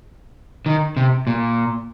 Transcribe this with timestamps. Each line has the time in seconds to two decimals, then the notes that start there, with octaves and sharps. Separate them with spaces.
0.66 D#3
0.97 C3
1.27 A#2